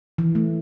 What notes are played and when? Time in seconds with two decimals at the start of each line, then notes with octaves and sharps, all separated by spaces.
0.18 E3
0.35 A3